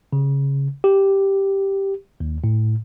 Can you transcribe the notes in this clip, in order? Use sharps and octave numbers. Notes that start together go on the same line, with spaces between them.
C#3
G4
D#2
A2